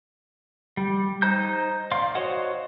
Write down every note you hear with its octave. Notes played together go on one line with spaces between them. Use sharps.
G3
D#4 C5 A#5 G6
D5 F5 C6
F#4 C5 C#5 D#5 F#5